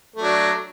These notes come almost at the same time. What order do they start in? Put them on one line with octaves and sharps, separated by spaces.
A3 F#3 D4